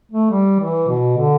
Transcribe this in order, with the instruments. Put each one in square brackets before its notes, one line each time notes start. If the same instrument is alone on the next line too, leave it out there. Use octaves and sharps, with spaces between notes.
[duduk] A3
G3
E3
B2
D3